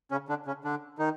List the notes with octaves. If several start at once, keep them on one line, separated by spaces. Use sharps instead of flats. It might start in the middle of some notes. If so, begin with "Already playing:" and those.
C#3 C#4
D3 D4
C#3 C#4
D3 D4
D#3 D#4